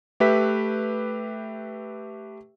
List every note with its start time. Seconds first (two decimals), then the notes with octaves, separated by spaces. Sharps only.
0.20 A3 G4 B4 E5 B6